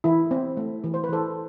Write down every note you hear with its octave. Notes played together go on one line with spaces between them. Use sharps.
E3 E4
C4
A3
E3
C5
B4
E3 A4 C5